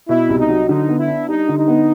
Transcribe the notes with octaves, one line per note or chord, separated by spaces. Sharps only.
B2 E4
C2
D#4
F#3
D3 D#4
B3
E4
D4
G3 D#4
D3
D#4
B3